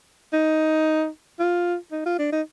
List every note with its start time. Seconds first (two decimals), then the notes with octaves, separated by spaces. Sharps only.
0.33 D#4
1.39 F4
1.92 D#4
2.06 F4
2.19 D4
2.32 D#4